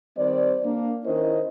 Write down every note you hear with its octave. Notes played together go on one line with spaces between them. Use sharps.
D#3 G3 C4 C5 D5
A#3 D4
D#3 C#4 E4 A#4 C5 D#5